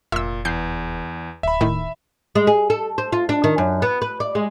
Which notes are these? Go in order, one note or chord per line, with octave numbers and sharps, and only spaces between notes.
F1 A#2 E5 E6
E2 G6 C7
D1 E5 B5
A2 D#3
G#3
G#4
A4
C5
F4
D4
D#3
F#2
B3
B4
D5
G#3